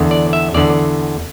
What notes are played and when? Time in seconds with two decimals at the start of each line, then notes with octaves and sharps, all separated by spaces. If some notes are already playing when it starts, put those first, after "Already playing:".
Already playing: E2 D3
0.11 D5
0.33 E5
0.54 E2 D3 D5